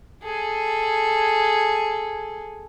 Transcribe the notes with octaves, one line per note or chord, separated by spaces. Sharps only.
G#4 A4